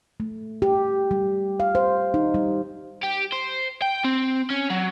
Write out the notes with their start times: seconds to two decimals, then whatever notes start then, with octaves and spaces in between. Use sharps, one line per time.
0.20 A3
0.62 G4
1.11 G3
1.60 F5
1.75 C5
2.14 D#4
2.34 G3
3.03 G4
3.32 C5
3.82 G5
4.04 C4
4.50 C#4
4.70 F#3